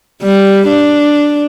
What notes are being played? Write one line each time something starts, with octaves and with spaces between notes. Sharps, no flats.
G3
D4